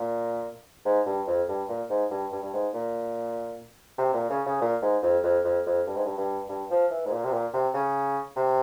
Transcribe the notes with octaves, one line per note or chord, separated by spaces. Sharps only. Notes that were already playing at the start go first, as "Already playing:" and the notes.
Already playing: A#2
G#2
G2
F2
G2
A#2
G#2
G2
G2
G2
G#2
A#2
C3
A#2
C#3
C#3
A#2
G#2
F2
F2
F2
F2
G2
G#2
G2
G2
G2
F3
E3
G#2
A#2
C3
A#2
C3
C#3
C3